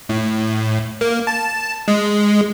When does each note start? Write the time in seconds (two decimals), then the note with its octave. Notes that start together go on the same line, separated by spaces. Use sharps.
0.09 A2
1.01 A#3
1.27 A5
1.88 G#3